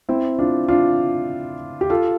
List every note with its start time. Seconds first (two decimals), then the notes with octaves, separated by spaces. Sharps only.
0.09 C4 E4
0.39 D4 F4
0.68 D4 F4
1.81 G4
1.90 F4 A4